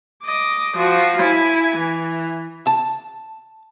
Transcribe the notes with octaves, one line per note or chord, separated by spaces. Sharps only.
D#5 D6
F3 F#4
E4 G#5
E3
A5